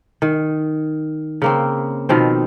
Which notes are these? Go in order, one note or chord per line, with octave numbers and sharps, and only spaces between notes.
D#3
C#3 A#3 C4
B2 D#3 F3 C4